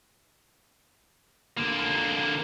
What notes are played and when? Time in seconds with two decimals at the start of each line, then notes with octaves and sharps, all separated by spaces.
1.57 D3 A#3